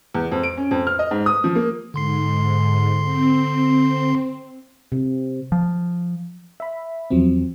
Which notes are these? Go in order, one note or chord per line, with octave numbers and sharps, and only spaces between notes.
E2
F2
D7
C#4
F2
F6
D#5
G#2
D#6
F3
A#3
G#2 D3 C6 C7
C4
C3
F3
E5 B5
E2 F3 F#3 C4